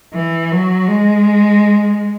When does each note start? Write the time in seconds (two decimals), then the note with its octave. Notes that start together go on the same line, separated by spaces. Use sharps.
0.14 E3
0.52 F#3
0.88 G#3